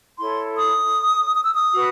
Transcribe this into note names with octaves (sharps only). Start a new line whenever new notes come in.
E4 A4 C#5 C6
D#6
D#6
E6
D#6
F#4 B4